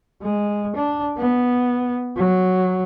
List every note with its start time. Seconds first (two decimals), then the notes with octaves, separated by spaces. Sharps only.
0.22 G#3
0.76 D4
1.17 B3
2.16 F#3